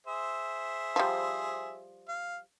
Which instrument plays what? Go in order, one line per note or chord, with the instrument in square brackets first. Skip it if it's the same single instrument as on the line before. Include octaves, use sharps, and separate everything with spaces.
[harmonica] G#4 C5 E5
[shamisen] F3 G3
[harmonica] F5